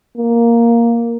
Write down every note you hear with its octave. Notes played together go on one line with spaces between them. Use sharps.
A#3